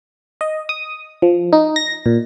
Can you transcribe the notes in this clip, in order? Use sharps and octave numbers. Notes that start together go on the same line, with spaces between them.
D#5
D#6
F3
D#4
A#6
A#2